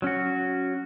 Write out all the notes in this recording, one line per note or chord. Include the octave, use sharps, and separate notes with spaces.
F#3 C#4 F#4